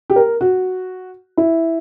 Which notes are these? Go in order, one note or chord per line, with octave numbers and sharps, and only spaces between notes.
G4
A#4
F#4
E4